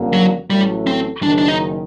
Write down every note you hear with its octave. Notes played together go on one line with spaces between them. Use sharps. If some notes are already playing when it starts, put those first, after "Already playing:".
Already playing: F#1 F#2 D3 G3 A#3
F#3
A1 A2 F#3 G3 A3
C4
F#1 F#2 D#3 D4
D4
D#4